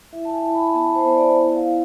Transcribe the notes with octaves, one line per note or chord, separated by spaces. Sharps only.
E4 E5
A5
G#5
E4
B5
B3 A5
C5
B3
D5
E4
F5
E4